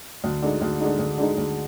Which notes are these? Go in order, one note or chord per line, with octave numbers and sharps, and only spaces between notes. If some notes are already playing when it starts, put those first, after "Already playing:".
D2
D3 G#3 D#4
D2
D3 G#3 D#4
D2
D3 G#3 D#4
D2